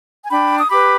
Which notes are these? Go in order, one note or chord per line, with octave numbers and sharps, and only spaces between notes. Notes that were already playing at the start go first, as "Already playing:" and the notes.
G#5
D4 G5 B5
D#6
G4 B4 B5 D6